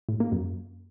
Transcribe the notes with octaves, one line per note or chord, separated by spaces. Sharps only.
A2
A#3
F#2